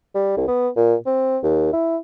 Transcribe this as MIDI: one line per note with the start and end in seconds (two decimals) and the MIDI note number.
0.15 0.32 55
0.37 0.45 36
0.48 0.69 59
0.76 0.95 46
1.06 1.38 60
1.43 1.69 39
1.73 1.97 64